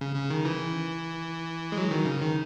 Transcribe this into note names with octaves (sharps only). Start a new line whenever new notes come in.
C#3
C#3
D#3
E3
G#3
F#3
D#3
C#3
D#3